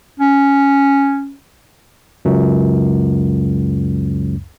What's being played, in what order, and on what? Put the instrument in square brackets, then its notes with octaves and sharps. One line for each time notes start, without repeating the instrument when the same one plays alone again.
[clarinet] C#4
[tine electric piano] C#2 F#2